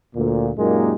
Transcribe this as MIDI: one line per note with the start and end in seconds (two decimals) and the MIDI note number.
0.16 0.50 38
0.16 0.50 46
0.57 0.95 42
0.57 0.95 46
0.57 0.95 56
0.57 0.95 58
0.57 0.95 63
0.57 0.95 67